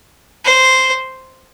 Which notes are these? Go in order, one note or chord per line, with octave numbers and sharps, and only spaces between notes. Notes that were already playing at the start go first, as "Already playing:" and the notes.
C5